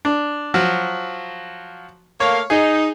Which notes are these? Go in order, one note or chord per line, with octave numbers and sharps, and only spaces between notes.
D4
F3 F#3 F#4
A3 A#3 C#5 F5
D#4 G#4